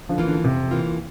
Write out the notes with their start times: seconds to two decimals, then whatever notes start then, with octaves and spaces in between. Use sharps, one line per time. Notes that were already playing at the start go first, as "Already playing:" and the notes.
0.09 D3 F3
0.18 E3 A#3 F4
0.28 D3
0.44 F2 C3
0.71 E3 A#3 F4